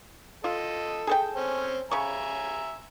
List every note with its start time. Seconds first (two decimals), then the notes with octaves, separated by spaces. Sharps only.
0.44 F4 A4 D#5
1.07 G#4 A4 G5
1.36 C4 C#4
1.91 C#3 E5 G#5 A#5 C#6